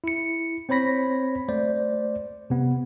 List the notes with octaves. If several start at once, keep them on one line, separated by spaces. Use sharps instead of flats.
E4 C#7
C4 C5 C#5 B5 A#6 B6
A3 C5 D5
C3 B3